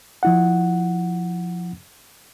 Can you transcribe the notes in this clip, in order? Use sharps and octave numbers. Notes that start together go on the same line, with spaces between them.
F3 E4 F#5